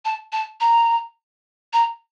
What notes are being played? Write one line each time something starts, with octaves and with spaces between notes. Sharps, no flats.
A5
A5
A#5
A#5